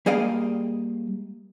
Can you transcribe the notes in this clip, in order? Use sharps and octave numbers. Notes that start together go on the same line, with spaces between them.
G3 A#3 G#4 D#5 F5 G5